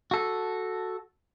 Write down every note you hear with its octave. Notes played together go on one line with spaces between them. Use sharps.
F#4 A4